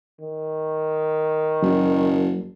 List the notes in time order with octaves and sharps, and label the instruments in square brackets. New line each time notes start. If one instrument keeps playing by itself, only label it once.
[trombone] D#3
[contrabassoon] F#1 [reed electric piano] F#3